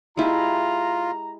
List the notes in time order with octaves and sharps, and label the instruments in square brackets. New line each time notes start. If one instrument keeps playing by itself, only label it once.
[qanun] G#3 E4 G4 [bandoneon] F4 [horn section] A#5